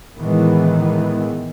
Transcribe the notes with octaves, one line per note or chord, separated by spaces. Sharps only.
A2 D#3 E3 G#3 B3